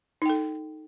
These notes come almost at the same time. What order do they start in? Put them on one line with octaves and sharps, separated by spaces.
D#4 G5 A4